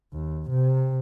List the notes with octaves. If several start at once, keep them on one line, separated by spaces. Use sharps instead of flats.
D#2
C3